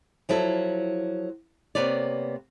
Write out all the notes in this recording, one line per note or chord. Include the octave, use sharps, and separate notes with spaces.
F3 F#3 E4 A4
C3 A#3 B3 B4 C#5 D5